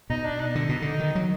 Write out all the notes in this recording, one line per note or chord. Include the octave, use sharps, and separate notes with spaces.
B2 D#4
D4
D#4
D3
B2
D3
D#3
F#3